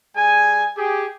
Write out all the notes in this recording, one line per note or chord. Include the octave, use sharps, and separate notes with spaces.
G3 G#4 G#5
G4 G#4